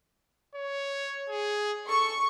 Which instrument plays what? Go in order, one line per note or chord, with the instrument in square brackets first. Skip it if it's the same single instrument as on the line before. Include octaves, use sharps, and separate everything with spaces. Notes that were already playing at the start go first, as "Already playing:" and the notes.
[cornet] C#5
G#4
[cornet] A4 [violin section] C#6